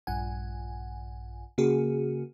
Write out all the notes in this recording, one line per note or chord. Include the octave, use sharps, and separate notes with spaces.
A#1 G2 F#5 G#5
C#3 A#3 F#4 G#4